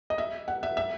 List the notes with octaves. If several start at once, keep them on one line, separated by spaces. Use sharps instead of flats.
D#5
E5
F#5
E5
E5